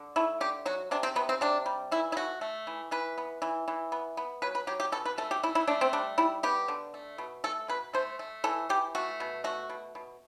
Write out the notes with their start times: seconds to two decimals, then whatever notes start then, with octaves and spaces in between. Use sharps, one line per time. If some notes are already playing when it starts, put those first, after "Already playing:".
Already playing: D3
0.16 A3 E4
0.41 D3 G4
0.66 F#3 F#4
0.91 C3 D4
1.03 C4
1.15 C3 B3
1.29 C4
1.41 C3 D4
1.66 G3
1.91 E3 E4
2.12 E4
2.16 A3 F#4
2.41 A3
2.67 E3
2.91 E3 B4
3.18 B3
3.42 E3
3.68 E3
3.92 B3
4.17 B3
4.42 F#3 B4
4.55 B4
4.67 F#3 G4
4.80 G4
4.92 B2 A4
5.05 B4
5.18 A3 A4
5.31 G4
5.43 A3 E4
5.55 E4
5.67 A3 D4
5.81 C4
5.93 G3 D4
6.18 G3 E4
6.43 B3 G4
6.68 D3
6.94 A3
7.18 B2
7.44 A3 A4
7.68 B2 B4
7.93 A3 C5
8.19 A3
8.44 E3 A4
8.69 E3 G4
8.95 A3 F#4
9.20 B2
9.44 A3 F#4
9.69 B2
9.95 B2